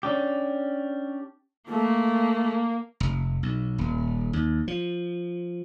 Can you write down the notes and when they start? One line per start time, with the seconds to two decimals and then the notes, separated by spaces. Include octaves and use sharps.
0.03 C#4 D4 G4
1.69 A3 A#3
3.00 F1
3.43 B1
3.78 D#1
4.33 D#2
4.68 F3